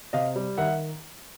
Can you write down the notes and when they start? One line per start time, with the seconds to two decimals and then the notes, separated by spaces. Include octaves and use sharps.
0.13 C3 D#5 F5
0.36 G3
0.58 D#3 E5 F#5